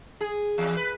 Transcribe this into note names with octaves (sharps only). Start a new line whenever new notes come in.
G#4
E2
B4